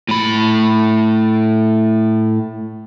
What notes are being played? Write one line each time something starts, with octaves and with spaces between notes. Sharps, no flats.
A2 B5